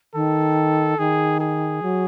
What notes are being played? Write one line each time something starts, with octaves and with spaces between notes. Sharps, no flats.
D#3 A4
D#3 G#4
G#4
F#3